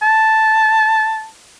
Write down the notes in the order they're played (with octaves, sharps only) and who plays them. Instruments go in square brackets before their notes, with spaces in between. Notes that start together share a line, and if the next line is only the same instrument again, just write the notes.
[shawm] A5